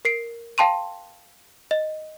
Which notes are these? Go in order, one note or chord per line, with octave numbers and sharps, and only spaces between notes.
A#4 C7 D7
F5 G5 A5 C6 D#7
D#5